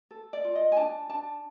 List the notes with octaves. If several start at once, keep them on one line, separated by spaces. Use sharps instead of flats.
A4
D5
F4
D#5
G#5
D4 A5
D4 A5